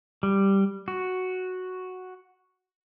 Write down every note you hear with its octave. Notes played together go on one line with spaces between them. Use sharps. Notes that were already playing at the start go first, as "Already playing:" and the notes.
G3
F#4